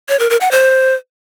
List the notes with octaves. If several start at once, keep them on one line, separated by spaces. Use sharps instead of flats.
C#5
A#4
A#4
F#5
C5